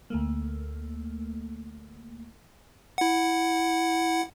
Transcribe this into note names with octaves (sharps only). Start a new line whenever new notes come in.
D2 A3 A#3
E4 F#5